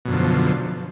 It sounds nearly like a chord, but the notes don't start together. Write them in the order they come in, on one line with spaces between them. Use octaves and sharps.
B2 F#2 D3 F3